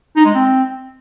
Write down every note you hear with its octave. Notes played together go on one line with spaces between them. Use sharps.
D#4
G#3
C4